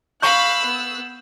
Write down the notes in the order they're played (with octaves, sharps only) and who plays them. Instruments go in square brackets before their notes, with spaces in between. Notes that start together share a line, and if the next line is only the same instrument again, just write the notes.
[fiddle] F5 B5 [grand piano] C#6 G6 [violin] E6 F#6
[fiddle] B3